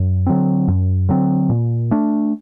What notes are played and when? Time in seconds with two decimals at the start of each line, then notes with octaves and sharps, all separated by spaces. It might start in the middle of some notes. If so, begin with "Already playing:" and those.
Already playing: F#2
0.27 D3 F#3 C4
0.68 F#2
1.09 D3 F#3 C4
1.50 A#2
1.91 A3 D4